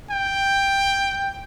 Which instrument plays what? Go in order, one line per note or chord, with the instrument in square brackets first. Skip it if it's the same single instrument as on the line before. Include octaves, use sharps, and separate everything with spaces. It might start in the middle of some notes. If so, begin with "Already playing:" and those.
[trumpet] G5